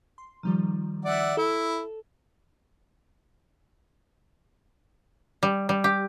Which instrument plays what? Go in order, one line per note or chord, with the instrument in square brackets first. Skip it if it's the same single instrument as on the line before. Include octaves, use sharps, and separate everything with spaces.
[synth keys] C6
D#3 F3 G3
[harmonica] D5 E5 F#5
[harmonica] E4 [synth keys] A4
[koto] G3
G3
G4